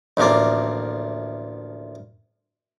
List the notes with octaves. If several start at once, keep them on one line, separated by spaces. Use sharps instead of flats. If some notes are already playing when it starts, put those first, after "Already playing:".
A1 D2 F3 A#3 D5